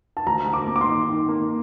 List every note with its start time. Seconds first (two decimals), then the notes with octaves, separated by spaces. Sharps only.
0.17 A5
0.27 D2 A#5
0.47 D2
0.53 D6
0.67 A#3
0.76 D6
0.81 C6
0.88 D#3
1.09 D#3
1.28 A#3